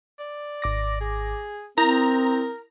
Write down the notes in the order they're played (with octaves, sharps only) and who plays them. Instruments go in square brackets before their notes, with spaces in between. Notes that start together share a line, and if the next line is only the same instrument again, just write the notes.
[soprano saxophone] D5
[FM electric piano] G#1 D6 A#6
[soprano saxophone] G#4
[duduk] C4 [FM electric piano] E4 D#6 G6 [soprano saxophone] A#4 [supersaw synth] A#5